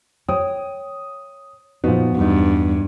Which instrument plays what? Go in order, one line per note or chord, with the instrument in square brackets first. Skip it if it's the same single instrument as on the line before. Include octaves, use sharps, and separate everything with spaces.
[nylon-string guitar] C#5 G5 [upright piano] D#6
[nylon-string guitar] A#2 F3 D#4 [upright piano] B3 F#4
[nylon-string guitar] E2 D#4 [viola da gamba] G2